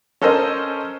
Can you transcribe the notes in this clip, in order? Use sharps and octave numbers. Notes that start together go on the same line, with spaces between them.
C#4 A4 A#4 C5 D#5